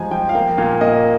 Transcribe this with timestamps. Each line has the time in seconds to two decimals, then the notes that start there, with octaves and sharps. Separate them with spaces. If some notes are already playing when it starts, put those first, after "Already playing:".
Already playing: F3 G3 G#3 G#5 A#5
0.11 F3 G5
0.29 F5
0.35 A#3 G5
0.57 A#2 F5
0.81 A#3 D#5